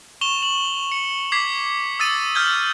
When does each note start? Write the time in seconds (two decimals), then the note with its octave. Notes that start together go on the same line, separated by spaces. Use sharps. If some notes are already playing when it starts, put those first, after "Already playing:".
0.21 C#6 E7 F7 G7
0.43 F#7
0.92 C#7
1.32 D6 G#6 B6 C7
1.99 D#6 E6 A6 D#7
2.35 E6 F6 G6 G#6 G7